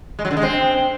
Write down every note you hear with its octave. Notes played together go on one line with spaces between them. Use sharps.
G#3
F#3
D3
G#3
C4